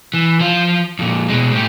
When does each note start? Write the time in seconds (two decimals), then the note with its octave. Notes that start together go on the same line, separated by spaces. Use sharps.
0.14 E3
0.40 F3 F4
0.99 F2 A#2
1.29 B2 G#3
1.53 A2 G4